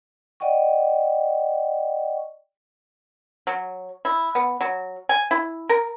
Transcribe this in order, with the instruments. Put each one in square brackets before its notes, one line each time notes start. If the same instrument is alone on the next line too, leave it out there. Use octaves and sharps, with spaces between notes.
[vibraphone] D5 D#5 F#5 G5 C#6
[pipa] F#3
E4
B3
F#3
G#5
E4
A#4